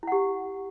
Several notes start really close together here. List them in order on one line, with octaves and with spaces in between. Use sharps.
E4 F#5 G4